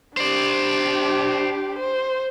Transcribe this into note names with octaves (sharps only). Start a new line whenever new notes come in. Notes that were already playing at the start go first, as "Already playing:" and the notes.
D4 G4 C5 D5
C5